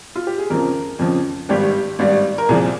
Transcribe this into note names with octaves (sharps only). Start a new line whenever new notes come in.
F4
G4
G#4
F2 C#3 F3 A#4
F2 C#3 F3
G#1 G2 G3 G4
G#1 G2 G3
A#4
C2 A#2 F3 G#4